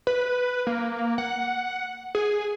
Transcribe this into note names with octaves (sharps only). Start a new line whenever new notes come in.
B4
A#3
F#5
G#4